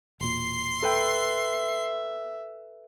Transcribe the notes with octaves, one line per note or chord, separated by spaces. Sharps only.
E1 A#2 C6 C7
A4 B4 E5 G5